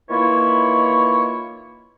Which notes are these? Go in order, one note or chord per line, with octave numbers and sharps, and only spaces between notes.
D#3 E3 A#3 E4 F4 C#5